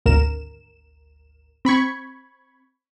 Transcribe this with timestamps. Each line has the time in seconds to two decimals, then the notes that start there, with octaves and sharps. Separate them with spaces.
0.06 G#1 D2 A#4 E7
1.65 C4 B5 C#6 G#6